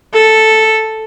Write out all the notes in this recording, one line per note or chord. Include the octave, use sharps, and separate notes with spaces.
A4